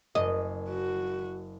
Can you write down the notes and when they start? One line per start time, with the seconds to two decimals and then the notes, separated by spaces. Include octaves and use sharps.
0.15 F#1 D#5
0.70 F#4